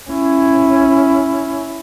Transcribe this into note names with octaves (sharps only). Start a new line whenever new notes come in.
C#4 E4